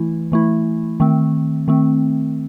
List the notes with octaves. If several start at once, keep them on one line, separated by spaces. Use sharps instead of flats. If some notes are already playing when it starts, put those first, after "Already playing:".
Already playing: E3 A3 E4
E3 A3 E4
D#3 A3 C4
D#3 A3 C4